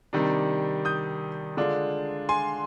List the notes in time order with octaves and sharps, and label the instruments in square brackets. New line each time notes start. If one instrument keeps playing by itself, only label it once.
[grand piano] C3 D#3 G3 D4
D#6 G6
D3 G#3 D4 F4
G#5 C6